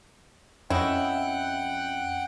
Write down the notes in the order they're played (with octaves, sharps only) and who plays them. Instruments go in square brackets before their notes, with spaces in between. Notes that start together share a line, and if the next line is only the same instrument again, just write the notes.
[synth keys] F2 [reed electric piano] C#4 D#5 [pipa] E4 [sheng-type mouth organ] F#5 G5 F#6